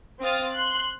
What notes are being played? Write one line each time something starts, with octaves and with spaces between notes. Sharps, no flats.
C4 F5 D#6 F6 A6
C6 F#6